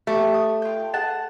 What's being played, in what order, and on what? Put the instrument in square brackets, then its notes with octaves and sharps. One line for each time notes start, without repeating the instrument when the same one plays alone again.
[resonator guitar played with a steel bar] A3 [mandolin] G4 D5 E5
[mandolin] D#6
F4 G5
G#4 F#5 A5